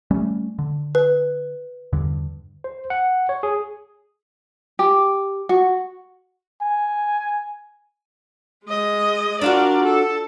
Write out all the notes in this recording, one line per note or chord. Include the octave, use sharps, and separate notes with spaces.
G3 A3 C#4
D3
B4
E2 G2 D3
C5
F#5
C#5
G#4
G4
F#4
G#5
G#3 D#5
D4 F4 F#4 A#4 D5
A4